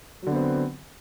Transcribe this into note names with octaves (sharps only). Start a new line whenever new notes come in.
D3 F#3 B3 C4